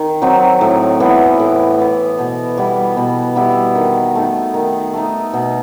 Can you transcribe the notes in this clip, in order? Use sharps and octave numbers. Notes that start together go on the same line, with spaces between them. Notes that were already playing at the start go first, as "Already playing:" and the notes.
Already playing: D#3
F#3 C4 D#4
A2
E3 B3
A2
E3 B3
B2
G3 B3 E4
B2
G3 B3 E4
D#3
A3 D#4
D#3
A3 D#4
B2